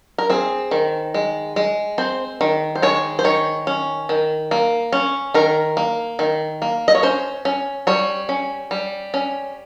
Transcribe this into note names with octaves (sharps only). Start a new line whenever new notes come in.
A#4
C4 G#4
D#3
G#3
G#3
C4 C5
D#3
C5
G#3 C#5
C5
D#3 C#5
C#4
D#3
A#3
C#4
D#3 A#4
A#3
D#3
A#3
D#5
C#5
C#4 C5
C#4
G3 C#5
C#4
G3
C#4